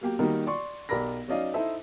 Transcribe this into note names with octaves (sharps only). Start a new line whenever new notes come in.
F#3 A#3 G4
D#3 G3 A#3 D#4 F#4 A#4
D5 C6 C#6
B1 G4 A#4 D5 B5 A#6
F#3 C#4 D#4 D5 D#5 F5
D#4 E4 A4 C5 D#5 E5